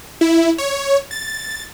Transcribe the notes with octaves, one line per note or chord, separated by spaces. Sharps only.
E4
C#5
A6